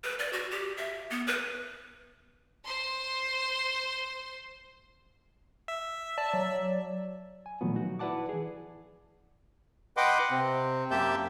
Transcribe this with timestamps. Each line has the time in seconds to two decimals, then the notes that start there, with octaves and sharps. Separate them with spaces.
0.04 B4
0.19 D5
0.33 F#4
0.51 G4
0.77 E5
1.11 B3
1.27 B4
2.64 C5 C6
5.68 E5
6.18 D5 A5
6.33 F#3
7.46 G#5
7.61 A#2 D#3 F3 F#3 A3 B3
7.75 D#4 F#4
7.99 E4 B4 D5 F#5 A5 D6
8.29 E3 G#4
9.97 B4 D#5 F#5 G5 C6 D6
10.31 C3 C4
10.91 F#2 A#3 G4 E5 A5 G6